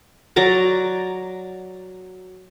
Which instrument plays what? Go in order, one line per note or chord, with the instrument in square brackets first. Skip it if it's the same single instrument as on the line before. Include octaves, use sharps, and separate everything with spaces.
[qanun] F#3 D5 A#5 D6